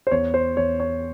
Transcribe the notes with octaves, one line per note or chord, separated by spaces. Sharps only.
C5
E2 C#5
C5
E2 C#5
C#5